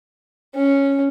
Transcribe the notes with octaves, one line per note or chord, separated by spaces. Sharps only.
C#4